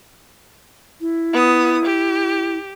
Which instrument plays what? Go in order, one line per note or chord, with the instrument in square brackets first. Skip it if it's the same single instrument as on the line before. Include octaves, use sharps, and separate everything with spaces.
[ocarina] E4
[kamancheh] B3 D#6
G4